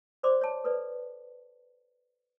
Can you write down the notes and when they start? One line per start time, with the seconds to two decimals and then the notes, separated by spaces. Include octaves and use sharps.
0.23 C5 D5 C6 D6
0.41 C#5 A5
0.64 A4 B4 D5